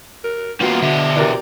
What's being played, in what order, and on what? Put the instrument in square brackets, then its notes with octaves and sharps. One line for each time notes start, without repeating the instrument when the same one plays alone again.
[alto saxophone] A#4
[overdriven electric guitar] G3 A#3 [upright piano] B3 [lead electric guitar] F4 F5 [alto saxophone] F#4
[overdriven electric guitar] B2 E5 [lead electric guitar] D3
[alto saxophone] E3 [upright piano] G4 A#4 D5